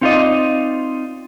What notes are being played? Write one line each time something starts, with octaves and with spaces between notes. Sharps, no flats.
C4 D#4 F4 F#4 D5 D#5